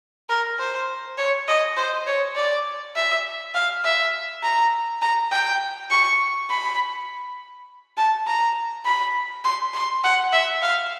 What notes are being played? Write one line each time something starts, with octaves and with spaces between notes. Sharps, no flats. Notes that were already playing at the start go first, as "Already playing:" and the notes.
A#4
C5
C#5
D#5
C5
C#5
D5
E5
F5
E5
A#5
A#5
G5
C#6
B5
A5
A#5
B5
C6
C6
F#5
E5
F5